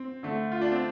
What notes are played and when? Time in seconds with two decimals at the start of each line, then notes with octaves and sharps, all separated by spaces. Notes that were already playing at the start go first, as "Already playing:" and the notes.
Already playing: C4
0.23 D3 A3
0.52 F4
0.61 D4
0.72 C4